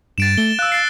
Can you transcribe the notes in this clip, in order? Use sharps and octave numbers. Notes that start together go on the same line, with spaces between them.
G2 A6 D7 E7
A3 G7
F5 E6 F#6
A6 C7